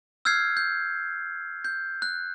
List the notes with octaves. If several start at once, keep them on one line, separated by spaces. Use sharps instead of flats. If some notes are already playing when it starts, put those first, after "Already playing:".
E6 F6 G6 G#6 C7
G6
G6
F#6